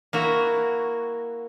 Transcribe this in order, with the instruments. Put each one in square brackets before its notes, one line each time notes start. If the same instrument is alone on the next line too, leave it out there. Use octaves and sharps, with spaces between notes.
[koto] A#3 E4 F#4